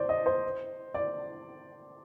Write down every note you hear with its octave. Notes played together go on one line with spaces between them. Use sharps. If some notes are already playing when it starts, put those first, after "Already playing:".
Already playing: C5 D5
D#5
C5
D5